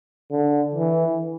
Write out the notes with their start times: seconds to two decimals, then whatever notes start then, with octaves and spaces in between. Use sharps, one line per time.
0.31 D3
0.74 E3